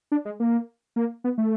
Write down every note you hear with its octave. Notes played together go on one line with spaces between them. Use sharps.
D4
G#3
A#3
A#3
B3
A3